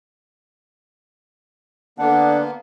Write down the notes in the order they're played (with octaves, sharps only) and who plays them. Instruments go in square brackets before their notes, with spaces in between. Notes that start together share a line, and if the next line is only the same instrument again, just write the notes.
[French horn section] D3 [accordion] A#3 B3 [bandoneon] D4 [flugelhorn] F#5